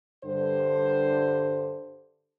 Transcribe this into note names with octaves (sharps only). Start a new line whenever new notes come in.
G2 D3 C5